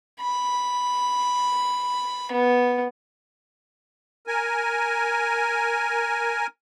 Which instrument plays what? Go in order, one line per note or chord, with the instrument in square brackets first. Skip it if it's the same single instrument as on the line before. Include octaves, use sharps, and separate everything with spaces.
[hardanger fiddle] B5
B3
[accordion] A#4 G#5